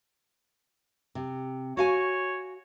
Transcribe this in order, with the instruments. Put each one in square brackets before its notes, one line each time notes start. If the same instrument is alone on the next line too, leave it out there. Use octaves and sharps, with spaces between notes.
[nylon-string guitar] C3
[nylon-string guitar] F#4 F5 G#5 [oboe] C#5